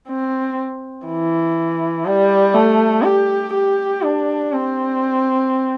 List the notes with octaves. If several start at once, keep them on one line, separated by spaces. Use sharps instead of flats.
C4
E3
G3
A3
G4
G4
D4
C4